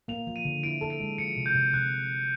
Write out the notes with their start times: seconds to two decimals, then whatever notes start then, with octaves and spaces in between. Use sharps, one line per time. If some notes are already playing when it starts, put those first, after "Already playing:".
0.08 A#3 F7
0.27 F3
0.36 D#7
0.45 D3
0.63 E4 D7
0.81 A4
0.90 D7
1.00 G#3
1.18 F3 C#7
1.37 C3
1.46 G6
1.55 C3
1.73 C3 F#6